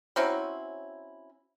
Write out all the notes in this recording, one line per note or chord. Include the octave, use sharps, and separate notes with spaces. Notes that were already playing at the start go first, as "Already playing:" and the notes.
F#3 C4 C#4 E4